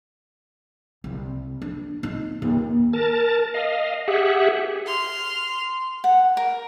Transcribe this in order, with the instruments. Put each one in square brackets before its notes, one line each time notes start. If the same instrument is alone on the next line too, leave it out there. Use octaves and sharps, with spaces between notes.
[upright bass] C2
D4
D#4
D#2
[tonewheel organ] A#4 A5
D#5 F5
G4 G#4 E5 F#5
[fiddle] C6 F6
[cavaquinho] F#5
A#4